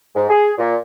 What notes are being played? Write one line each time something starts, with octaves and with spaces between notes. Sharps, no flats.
G#2
G#4
A#2